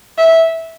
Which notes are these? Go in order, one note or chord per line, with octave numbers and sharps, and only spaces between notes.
E5